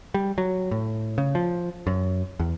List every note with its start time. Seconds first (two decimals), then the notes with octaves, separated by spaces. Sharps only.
0.14 G3
0.38 F#3
0.71 A2
1.18 C#3
1.35 F3
1.87 F#2
2.40 E2